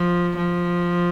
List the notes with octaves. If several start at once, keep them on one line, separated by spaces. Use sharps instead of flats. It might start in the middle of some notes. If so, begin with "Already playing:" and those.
Already playing: F3
F3